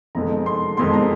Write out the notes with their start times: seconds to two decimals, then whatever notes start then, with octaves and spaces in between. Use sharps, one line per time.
0.15 F1 F2 D#3 G#3 A#5
0.46 C6
0.77 F1 F2 D#3 G#3 C6
0.94 A#5